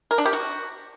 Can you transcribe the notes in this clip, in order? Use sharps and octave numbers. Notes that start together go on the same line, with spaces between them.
A#4
D4
G4
F#4